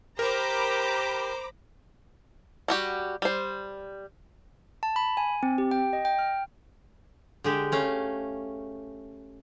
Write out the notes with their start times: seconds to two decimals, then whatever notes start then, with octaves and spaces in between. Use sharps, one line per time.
0.19 G4 A#4 C5 A#5 B5 D6
2.68 G3 F#4 G4
3.22 G3 C5
4.83 A5
4.96 B5
5.17 G#5
5.43 C4
5.58 G4
5.71 G5
5.93 D#5
6.05 G5
6.19 F6
7.44 D3 G#3 G4
7.72 A3 C#4 F5